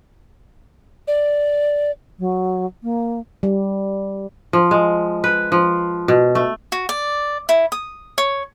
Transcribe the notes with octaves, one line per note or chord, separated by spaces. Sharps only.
D5
F#3
A#3
G3
F3
G#3
B4
F3
B2
A3
F#4
D5
E4
D#6
C#5